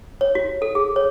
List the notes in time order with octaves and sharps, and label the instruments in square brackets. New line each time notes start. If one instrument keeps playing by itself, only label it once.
[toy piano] C#5
F#4
A4
G#4
C#5